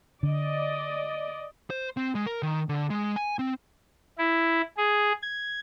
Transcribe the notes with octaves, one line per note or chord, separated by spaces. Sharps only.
D3 D5 D#5
C5
C4
G#3
A#4
D#3
D3
G#3
G#5
C4
E4
G#4
G#6